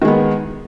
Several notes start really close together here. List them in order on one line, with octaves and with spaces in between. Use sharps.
D#3 G#3 B3